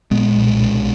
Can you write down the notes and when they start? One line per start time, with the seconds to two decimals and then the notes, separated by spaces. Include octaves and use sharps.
0.11 A#2 G#3 B3
0.36 B1
0.61 B1